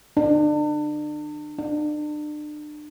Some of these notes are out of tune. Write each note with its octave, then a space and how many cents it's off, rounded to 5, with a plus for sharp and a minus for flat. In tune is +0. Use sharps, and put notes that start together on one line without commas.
D4 +35
D4 +35